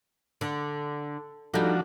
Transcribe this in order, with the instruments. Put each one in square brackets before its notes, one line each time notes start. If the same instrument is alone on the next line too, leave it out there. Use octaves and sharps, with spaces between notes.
[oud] D3
[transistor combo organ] F3 D4 F#4 [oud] G3 D#4 [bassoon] A4